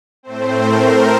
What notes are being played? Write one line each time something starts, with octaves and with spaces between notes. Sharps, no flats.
A2 A3 C4 C5
A#4